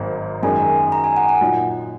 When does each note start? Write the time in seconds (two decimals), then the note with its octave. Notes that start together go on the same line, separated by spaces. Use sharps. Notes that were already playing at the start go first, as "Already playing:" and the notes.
Already playing: G#1 G#2 F#3 A#3 F#4
0.43 F#2 D#3 G#3 D#4 G#5
0.92 A#5
1.04 G#5
1.17 F#5
1.29 F#5
1.41 A#2 F#3 D#4